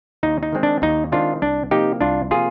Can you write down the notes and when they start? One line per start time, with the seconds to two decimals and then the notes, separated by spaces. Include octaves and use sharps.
0.23 D#2 D#4
0.43 D#4
0.53 D#3 G#3 C4
0.63 D4
0.82 D#2 D#4
1.12 D#3 G#3 C4 D4 F4
1.41 C2 D4
1.71 C3 F3 A#3 D#4 G4
2.01 C2 D4 F4
2.31 C3 F3 A#3 F4 G#4